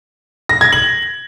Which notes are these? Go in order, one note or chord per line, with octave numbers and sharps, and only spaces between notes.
A#6
G#6
F#7